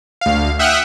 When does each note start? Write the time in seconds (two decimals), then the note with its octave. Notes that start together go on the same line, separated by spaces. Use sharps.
0.21 D2 F5
0.59 E5 F#5 G5 D#6 F6 F#6